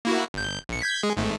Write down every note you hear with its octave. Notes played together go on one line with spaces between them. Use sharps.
A#3 E4 F#4
G1 G6
A#1 C#7
G6 G#6 B6
G#3 G#4
G#1 G#2 A3